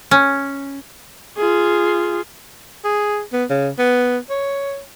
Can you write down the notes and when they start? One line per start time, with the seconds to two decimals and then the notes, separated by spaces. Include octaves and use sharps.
0.11 C#4
1.37 F4 G#4
2.85 G#4
3.33 B3
3.50 C#3
3.79 B3
4.30 C#5